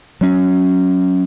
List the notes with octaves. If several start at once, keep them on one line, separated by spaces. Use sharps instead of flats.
F#3 C#4